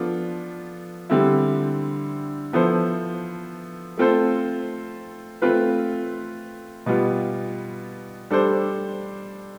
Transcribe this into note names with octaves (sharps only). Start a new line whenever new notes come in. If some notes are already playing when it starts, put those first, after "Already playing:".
Already playing: F3 B3 D4 F4 A4
D3 G3 C4 E4
F3 B3 E4 A4 C5
A3 C4 F4 A4 C5
A3 C4 F4 B4
B2 G3 B3 F4
G3 D4 A4 C5